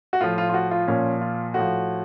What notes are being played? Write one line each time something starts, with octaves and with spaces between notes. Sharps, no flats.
F#4
A2 F3 F4
F4
F4
F#4
F4
A#2 F3 C#4
F4
A2 F3 F#4